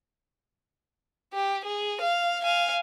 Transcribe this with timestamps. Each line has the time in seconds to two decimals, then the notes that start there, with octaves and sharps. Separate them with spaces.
1.34 G4
1.64 G#4
2.01 F5
2.42 F5 G#5